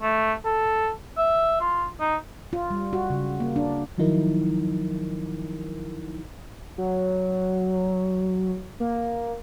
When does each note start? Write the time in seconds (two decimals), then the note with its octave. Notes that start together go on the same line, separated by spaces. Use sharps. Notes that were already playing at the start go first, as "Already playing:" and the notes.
0.02 A3
0.45 A4
1.18 E5
1.60 F4
2.00 D#4
2.53 F4
2.71 G3
2.93 F#4
3.10 C#3
3.40 A#3
3.56 D4
3.98 D#3 F3 F#3 D#4 E4 A#4
6.78 F#3
8.80 A#3